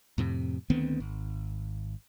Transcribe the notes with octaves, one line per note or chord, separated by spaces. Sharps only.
F2 A2 C3
D2 D#3 B3 C4
G#1